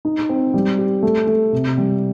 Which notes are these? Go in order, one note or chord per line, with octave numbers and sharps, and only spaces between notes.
D#4
C4
G3
G4
A3
A3
C3
G3